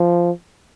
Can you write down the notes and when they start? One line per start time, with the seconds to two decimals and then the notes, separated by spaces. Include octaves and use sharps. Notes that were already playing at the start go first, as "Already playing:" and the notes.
Already playing: F3